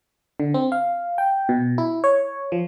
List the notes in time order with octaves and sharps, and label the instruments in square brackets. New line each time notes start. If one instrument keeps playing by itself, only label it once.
[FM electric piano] D3
C4
F5
G5
B2
E4
C#5
F3